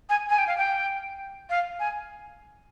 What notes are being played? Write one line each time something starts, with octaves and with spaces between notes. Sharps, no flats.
G#5
G#5
G5
F5
G5
F5
G#5